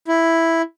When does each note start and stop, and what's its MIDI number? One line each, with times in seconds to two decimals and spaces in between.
0.08 0.62 64